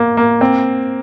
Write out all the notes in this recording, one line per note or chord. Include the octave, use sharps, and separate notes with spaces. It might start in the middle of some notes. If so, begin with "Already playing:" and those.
Already playing: A#3
A#3
C4